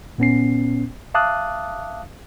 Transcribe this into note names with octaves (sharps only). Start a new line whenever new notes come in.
A#2 B3 C#4 C7
E5 F5 A5 D6 D#6 F#6